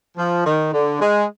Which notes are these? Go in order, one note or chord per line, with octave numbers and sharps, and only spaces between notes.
F3
D#3
D3
G#3